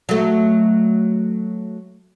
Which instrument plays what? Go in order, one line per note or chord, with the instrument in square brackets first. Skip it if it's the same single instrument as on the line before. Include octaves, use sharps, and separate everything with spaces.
[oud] F#3 A3